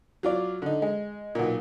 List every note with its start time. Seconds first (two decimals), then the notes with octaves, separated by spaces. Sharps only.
0.23 F#3 F4 D5
0.62 D3 D#4
0.82 G#3
1.35 B1 A#2